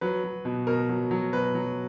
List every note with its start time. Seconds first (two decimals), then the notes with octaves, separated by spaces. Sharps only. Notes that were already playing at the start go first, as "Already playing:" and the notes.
0.01 F#3 B4
0.24 F#3
0.45 B2
0.67 B2 A#4
0.89 F#3
1.11 F#3
1.33 B2 B4
1.55 F#3